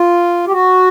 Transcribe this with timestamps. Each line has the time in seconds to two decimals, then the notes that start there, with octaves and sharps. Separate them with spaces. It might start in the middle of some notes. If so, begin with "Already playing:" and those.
Already playing: F4
0.47 G4
0.52 F#4